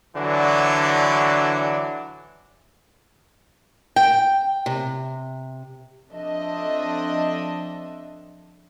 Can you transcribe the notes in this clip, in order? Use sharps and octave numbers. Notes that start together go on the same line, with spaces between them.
D3 E3 F#3 D4 F#4
G5
C3
F3 C4 D4 A4 D#5 E5